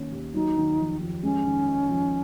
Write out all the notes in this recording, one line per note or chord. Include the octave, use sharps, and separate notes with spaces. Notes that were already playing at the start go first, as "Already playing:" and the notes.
Already playing: D#3 A#3 C#4
D#2
F#3 D#4
D#3
F2
F2
G#3 C#4
D#3
D#4
F2